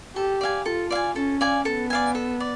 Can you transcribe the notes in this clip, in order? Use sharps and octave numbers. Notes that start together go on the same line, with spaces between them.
G4 A4
D5 F5 G#5
F4 A4
D5 F5 G#5
C#4 A4
D5 F5 G#5
B3 A4
D5 F5 G#5
A4
D5